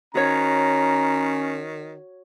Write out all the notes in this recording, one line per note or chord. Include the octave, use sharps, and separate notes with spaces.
D#3 C#4 F#4 C#5 A#5